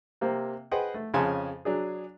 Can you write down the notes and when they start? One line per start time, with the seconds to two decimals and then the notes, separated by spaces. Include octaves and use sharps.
0.21 C3 A#3 C4
0.71 G#4 B4 C5 D#5 F#5 G5
0.94 A3
1.14 F2 C#3 C#5 G#5 A5 C6
1.65 F#3 D4 G#4